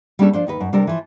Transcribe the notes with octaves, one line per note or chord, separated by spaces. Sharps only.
G3 A#3 C#4 D4 G#4 A4
F3 D4 C5
D#2 D#4 B4
F#2
C3 G3 D4 A4 A#4
E3 F3